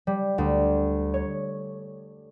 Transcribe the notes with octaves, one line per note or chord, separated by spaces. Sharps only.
G3
D2
C#5